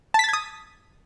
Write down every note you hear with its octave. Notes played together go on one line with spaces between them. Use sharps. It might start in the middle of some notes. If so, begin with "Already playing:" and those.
A5 D#6 G#6 A6 B6